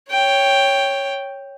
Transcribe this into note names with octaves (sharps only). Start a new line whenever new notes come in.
C#5 G5